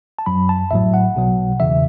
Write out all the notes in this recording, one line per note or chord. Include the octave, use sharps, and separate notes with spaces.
A5
F#2 F#3 B5
A5
A1 A2 F#3 E5
F#5
B1 B2 F#3
E2 C#3 E3 E5